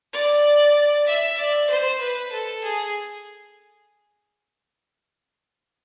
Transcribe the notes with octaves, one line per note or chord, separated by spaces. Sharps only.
D5
E5
D5
C5
B4
A4
G#4